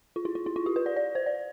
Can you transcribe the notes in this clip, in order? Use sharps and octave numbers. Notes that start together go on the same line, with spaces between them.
F4
E4
F4
E4
F4
G4
B4
D5
D5
C5
D5